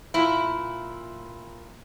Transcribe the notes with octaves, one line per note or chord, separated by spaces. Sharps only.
A#2 E4